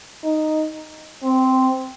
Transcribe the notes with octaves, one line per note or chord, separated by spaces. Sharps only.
D#4
C4